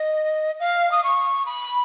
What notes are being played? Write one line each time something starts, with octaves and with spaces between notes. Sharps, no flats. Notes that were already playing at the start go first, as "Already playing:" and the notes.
Already playing: D#5
F5
D#6
C#6
B5